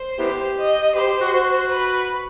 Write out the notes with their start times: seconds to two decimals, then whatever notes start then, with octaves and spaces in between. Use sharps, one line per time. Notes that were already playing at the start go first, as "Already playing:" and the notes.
Already playing: C5
0.19 B3 E4 G4
0.57 D#5
0.95 G4 C5
1.08 G4
1.21 F#4
1.33 F#4
1.71 B4